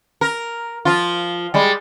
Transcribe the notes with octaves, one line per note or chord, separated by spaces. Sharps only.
A#4
F3 F4
G3 G#3